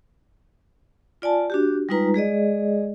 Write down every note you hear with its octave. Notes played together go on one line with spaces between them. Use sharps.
F4 D5 G#5 A5
D4 F#4 G4
G3 G#3 D#4 F4 B4 A#5
G#3 G#4 D5 D#5